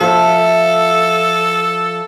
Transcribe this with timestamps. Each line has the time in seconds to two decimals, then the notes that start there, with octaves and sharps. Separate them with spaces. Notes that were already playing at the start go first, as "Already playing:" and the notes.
0.01 F3 A4 E5